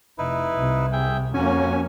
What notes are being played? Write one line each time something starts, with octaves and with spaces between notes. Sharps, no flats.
F1 D#4 E4 B4
C2 C3
G#4 E5 G5
F2 A#3 C#4 F#4 G#5